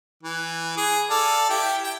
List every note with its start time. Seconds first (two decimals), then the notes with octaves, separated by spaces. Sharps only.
0.23 E3
0.77 G#4
1.10 A4 D5 F5
1.50 E4 G4
1.84 G5